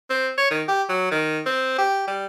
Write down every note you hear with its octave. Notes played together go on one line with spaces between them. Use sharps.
C4
C#5
D#3
G4
F#3
D#3
C4
G4
G3